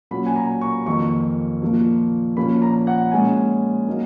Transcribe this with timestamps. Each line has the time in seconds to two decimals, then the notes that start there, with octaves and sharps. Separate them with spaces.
0.11 A#2 F#3 C#4 B5
0.26 G#5
0.36 A#5
0.61 C#6
0.86 F2 D#3 A#3 C#6
1.62 A#2 F3 A#3
2.37 A#2 F3 A#3 C#4 B5
2.62 A#5
2.87 F#5
3.11 A#2 G#3 C#4 G#5
3.88 F#3 A#3 D#4